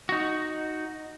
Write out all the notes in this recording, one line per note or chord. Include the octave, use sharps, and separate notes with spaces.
D#4 F#4